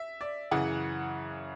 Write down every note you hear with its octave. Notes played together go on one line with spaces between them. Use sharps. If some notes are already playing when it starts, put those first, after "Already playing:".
Already playing: E5
D5
F#2 C#3 E3 F#5